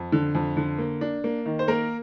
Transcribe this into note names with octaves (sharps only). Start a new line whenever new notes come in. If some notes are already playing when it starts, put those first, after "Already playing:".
Already playing: F2
D3
F2
D3
A#3
D4
A#3
D#3
C5
A#3 A#4